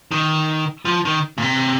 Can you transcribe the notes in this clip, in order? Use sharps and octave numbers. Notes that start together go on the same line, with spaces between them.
D#3
F3
D#3
A#2
C3